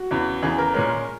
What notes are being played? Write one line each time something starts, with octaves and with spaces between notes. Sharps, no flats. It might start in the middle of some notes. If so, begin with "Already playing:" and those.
Already playing: F#4
E2 C#3 E3
E2 C#3 E3 G#4
A#4
A#2 G#3 C#4 A#4